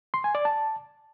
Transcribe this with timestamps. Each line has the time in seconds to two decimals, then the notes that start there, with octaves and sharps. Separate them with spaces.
0.14 C6
0.24 G#5
0.35 D5
0.45 A5